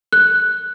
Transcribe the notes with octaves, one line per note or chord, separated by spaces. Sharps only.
F#6